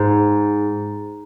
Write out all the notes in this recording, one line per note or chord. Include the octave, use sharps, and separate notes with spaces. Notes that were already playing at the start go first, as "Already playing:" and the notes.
Already playing: G#2